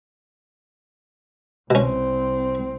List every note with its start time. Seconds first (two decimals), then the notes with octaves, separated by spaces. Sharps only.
1.70 C2 B2 C4 C#4